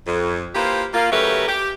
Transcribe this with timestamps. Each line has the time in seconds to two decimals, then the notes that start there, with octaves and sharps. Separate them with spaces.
0.07 F2
0.55 A#3 E4 F4 G4 B4 C5
0.94 A#3 F4
1.11 C#3 F#3 A3 G4 A#4 B4
1.48 G4